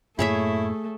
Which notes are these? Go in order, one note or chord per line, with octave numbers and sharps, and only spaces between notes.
F#2 A2 A3 A#3 E4 G#4 C#5 E5